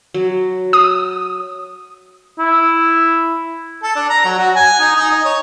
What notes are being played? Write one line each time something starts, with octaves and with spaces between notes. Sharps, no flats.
F#3
D#6
E4
A4
D4
A#5
F#3
F#4
G#5
D#4
D#4
D#5
C#5